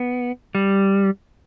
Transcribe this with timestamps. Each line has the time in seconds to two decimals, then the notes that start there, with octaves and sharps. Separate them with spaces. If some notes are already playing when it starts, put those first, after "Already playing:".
Already playing: B3
0.55 G3